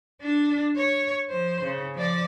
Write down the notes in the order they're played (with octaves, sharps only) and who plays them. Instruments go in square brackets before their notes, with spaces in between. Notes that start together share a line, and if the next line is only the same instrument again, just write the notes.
[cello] D4
C#5
F3 C5
C#3
F3 D5